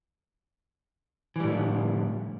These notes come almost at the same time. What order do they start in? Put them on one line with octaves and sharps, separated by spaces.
E3 G3 A2 D3 F3